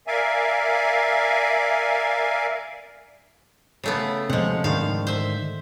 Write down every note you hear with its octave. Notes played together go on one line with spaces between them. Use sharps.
A#4 D5 E5 F5 G#5
C#3 A3 B3
C3 F3 G#3 F#5
G#2 D3 D#3 F5
C5 E5